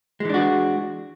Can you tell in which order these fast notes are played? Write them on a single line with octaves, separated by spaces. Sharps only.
G#3 E3 D4 F#4